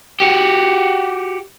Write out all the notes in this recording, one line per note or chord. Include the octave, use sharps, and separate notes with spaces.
F#4 G4